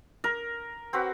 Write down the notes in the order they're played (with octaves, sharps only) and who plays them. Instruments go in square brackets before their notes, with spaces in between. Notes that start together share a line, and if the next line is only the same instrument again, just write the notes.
[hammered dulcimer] A#4
[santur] C4 F#4 B4